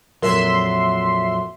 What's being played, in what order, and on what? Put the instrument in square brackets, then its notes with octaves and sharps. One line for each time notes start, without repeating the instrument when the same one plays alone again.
[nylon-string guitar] F2 A#2 F#3 [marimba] A#4 [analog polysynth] E5 C6